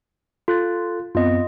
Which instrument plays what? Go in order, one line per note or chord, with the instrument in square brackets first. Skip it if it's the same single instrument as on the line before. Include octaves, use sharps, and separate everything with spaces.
[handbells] F4 [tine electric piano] A4 F#6 A6
[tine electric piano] F#2 B3 C4 [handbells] F4 D#5